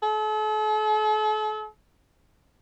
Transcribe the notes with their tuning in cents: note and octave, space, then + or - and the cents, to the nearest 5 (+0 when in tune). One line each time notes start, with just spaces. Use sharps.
A4 -45